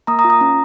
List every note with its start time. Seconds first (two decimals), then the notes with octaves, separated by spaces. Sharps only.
0.07 A#3 A#5 D#6
0.19 A#5 D#6
0.24 F4
0.30 A#5 D#6
0.41 C#4